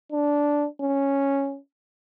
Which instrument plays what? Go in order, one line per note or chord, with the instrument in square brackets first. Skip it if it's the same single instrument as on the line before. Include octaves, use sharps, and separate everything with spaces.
[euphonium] D4
C#4